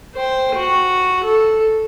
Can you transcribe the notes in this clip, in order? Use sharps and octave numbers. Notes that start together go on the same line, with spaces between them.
C5 G5
F#4
A4